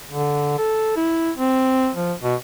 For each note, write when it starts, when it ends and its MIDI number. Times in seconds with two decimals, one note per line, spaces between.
0.11 0.58 50
0.58 0.95 69
0.96 1.31 64
1.38 1.90 60
1.95 2.13 53
2.23 2.35 47